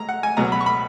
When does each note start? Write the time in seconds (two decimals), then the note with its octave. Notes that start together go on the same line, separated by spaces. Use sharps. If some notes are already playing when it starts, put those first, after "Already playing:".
Already playing: G#3 A#5
0.09 F#5
0.23 G#5
0.37 C#2 B2 F#3 B3 A#5
0.52 B5
0.61 C#6
0.66 B5